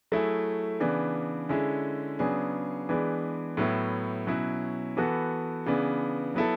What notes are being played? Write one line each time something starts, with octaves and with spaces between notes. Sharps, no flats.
F#3 A3 E4 G#4
C#3 E3 B3 D4
D3 G#3 C#4 E4
C#3 F#3 B3 D4 G#4
E3 G#3 B3 D4
A2 F#3 B3 E4
B2 F#3 C#4 E4
E3 B3 F#4 A4
C#3 E3 B3 D4
F#3 B3 E4 A4